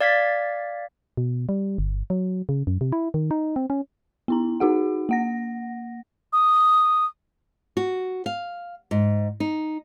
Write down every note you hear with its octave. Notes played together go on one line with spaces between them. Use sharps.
D5 F5 G#6 A6 B6
B2
G3
G1
F#3
C#3
F#2
C3
E4
D#3
D#4
C4
C#4
B3 E4 A#5
D#4 F#4 G#4 F#5
A#3 F#5 A#6
D#6
F#4
F5
G#2
D#4